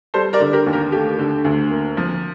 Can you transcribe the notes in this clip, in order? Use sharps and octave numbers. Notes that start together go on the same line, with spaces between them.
G3 A4 C5
A#4 D5
D3
G4 A#4
D#2
G4 A#4
A3 G4
D3
D2
A#3
F3